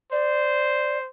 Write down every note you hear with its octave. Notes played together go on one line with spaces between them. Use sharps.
C5 D5